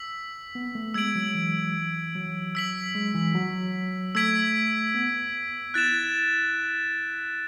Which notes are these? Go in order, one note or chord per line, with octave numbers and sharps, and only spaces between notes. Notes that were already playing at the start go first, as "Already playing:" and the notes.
Already playing: E6 B6 F#7
B3
A3
G#3 E6 G#6 D7 F#7
F#3
E3
F#3
E6 B6 F#7
G#3
E3
F#3
A3 E6 G#6 B6 D7 F#7
B3
E4 F#6 A6 E7